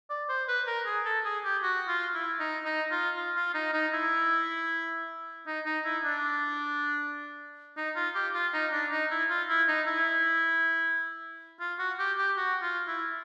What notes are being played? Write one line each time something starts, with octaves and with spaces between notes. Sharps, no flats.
D5
C5
B4
A#4
G#4
A4
G#4
G4
F#4
F4
E4
D#4
D#4
F4
F4
F4
D#4
D#4
E4
D#4
D#4
E4
D4
D#4
F4
G4
F4
D#4
D4
D#4
E4
F4
E4
D#4
E4
F4
F#4
G4
G4
F#4
F4
E4